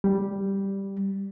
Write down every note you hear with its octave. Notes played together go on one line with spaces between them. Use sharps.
G3